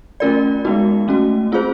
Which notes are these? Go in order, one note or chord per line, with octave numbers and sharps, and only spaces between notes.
A3 C#4 F4 A#4 D5
G#3 B3 D#4 F#4
A3 C#4 F#4
C4 F4 G#4 C5